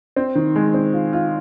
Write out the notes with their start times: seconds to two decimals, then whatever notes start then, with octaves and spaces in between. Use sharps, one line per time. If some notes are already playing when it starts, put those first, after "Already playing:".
0.16 C4
0.35 D#3
0.56 G#3
0.74 C4
0.93 F4
1.13 F4